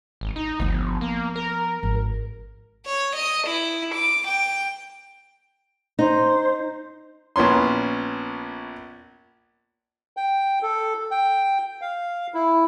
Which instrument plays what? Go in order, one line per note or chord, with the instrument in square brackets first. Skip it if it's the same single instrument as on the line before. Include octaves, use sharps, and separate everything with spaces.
[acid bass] G#1
D#4
[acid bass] G1 [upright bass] F3 B3
[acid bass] A#3
A#4
[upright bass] G#1
[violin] C#5
D#5
E4
D6
G5
[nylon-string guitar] D#4 [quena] C5
[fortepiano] A#1 B3 C#4 C6
[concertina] G5
A4
G5
F5
E4